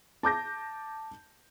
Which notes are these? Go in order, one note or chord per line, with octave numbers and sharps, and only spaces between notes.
A5 D6 G6 A#6